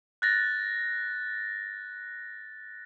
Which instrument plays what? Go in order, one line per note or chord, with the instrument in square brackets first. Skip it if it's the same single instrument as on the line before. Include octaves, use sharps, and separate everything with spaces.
[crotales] F#6 A6 A#6